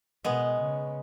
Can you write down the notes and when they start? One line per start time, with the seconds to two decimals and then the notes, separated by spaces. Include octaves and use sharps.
0.25 B2 G#3 B3
0.60 C#3